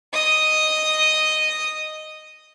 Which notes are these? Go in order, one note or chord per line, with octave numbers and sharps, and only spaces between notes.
D#5 D#6